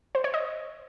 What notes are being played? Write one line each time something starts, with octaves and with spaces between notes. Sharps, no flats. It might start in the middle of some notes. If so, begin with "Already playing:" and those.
C5
C#5
D#5